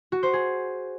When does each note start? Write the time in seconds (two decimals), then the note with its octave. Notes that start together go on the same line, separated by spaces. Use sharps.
0.12 F#4
0.23 C5
0.33 G#4